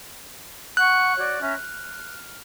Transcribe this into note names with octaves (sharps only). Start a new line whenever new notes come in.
F#5 C#6 F#6
F#4 C#5 D5
C#4 E5 A#5
F6